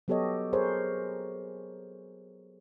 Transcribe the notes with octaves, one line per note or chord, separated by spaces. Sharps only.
F#3 B3 G4 A4 C#5 D#5
G#4 A#4 C5 C#5